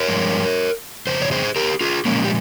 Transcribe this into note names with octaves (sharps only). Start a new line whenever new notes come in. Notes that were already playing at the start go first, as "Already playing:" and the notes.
Already playing: A#4 C#5
G2 F3 G#3
F2 C#3 C5
C#5
G#4 C5
G4 A#4
F4 G#4
A#2 F3 G#3 A#3 C#4
G4